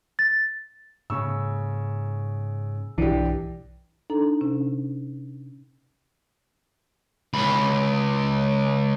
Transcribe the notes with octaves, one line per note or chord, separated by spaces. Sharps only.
A6
G#2 C#3 A#3 C#6 E6
B1 G2 E3 D4 G4
D4 D#4 A4 A#5
C3 C#4
C#2 B5